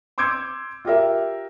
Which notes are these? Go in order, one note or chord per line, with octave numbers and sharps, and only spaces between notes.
C6 D6 E6 G6 G#6 D7
F4 G4 A#4 E5